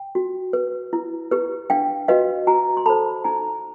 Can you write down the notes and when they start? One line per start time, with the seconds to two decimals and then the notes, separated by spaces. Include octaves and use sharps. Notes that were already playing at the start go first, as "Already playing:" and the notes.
Already playing: G5
0.15 F#4
0.53 B4
0.93 E4
1.31 G4 B4
1.70 D4 F5 G5
2.08 F#4 B4 D#5 F5
2.47 F#4 G#5 A#5
2.77 C6
2.86 A4 C5 A5 B5
3.24 D#4 G#5 A#5